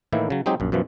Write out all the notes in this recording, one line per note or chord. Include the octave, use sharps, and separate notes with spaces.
A2 D#3 E3 A#3 E4
C#3 F#3
F#3 G#3 C4 D#4 G4 G#4
A#1 F#2
F#2 B2 E3 F3